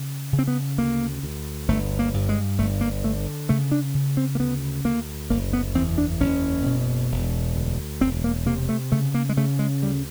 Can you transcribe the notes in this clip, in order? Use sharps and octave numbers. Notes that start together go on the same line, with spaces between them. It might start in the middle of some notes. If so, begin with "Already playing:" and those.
Already playing: C#3
C#3
C4
B3
D2 A#3
D2
G1 A3
A#3
G2
G#3
G1 A3
A#3
D3 A3
C#3 A3
D4
C#3
C4
A#3
D2 B3
D2 A#3
F#1 A#3
B3
E2 C4
D4
F#1 C#4
B2
E1
D2
E1 C4
A#3
C3 A#3
A3
C#3 A3
A#3
G#3
C#3 A3
G#3
D2 G3